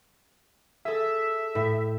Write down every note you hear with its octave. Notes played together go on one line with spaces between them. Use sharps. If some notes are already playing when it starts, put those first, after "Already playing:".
G#4 A4 E5
A2